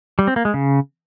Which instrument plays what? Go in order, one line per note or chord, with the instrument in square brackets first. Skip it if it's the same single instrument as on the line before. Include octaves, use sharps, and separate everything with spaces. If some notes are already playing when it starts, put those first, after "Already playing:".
[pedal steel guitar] G3
C4
A#3
G#3
C#3